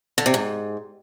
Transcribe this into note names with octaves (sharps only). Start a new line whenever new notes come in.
D3
C3
G#2